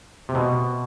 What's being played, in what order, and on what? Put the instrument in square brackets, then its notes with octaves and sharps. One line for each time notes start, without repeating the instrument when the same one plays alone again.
[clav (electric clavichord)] C3
B2